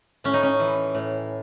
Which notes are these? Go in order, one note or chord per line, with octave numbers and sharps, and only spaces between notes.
A2 C#4
D#4
C#4
E3
A2